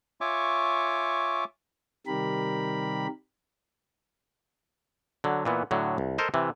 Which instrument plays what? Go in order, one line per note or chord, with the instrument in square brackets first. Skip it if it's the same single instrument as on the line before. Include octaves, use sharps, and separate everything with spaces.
[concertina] F4 C#5 E5 G#5 C#6 D6
[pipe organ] C3 D#3 G3 G4 A#4 B5
[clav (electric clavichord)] D3 F#3
A#2 E3 B3
A2 D3 F#3
C2
A4 A#4 C5 D#5
C3 E3